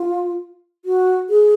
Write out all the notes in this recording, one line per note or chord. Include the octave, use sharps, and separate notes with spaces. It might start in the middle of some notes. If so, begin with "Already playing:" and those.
Already playing: F4
F#4
G#4